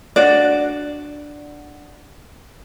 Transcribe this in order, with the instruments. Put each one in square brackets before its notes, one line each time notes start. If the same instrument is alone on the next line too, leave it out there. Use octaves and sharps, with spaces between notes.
[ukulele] D4 F#4 D5